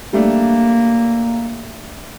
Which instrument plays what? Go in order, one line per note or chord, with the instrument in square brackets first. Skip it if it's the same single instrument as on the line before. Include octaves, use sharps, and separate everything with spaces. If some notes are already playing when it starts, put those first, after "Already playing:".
[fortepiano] G3 A3 D4 [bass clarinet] A#3